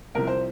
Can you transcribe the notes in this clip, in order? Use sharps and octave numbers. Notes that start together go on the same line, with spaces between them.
C2 C3 F3 A#4
C5